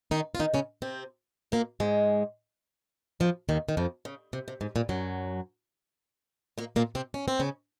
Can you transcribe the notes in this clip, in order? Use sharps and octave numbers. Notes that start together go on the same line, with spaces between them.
D#3 D#4
F4
D#3 D#4
C#3 C#4
C3 C4
A#2 A#3
G#2 G#3
F2 F3
D#2 D#3
D#3
F2 F3
C#3
C3
C3
G#2
A#2
F#2 F#3
A#2 A#3
A#2 A#3
C3 C4
C#4
C4
C#3 C#4